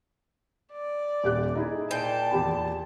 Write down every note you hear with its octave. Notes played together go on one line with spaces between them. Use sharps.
D5
D#1 G4 F#6
D#4 E4 G#4
A#2 G5 A5
E2 G4 B5